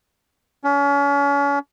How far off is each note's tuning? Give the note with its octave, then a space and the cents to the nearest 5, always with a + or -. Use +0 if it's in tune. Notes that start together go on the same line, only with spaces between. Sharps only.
C#4 +35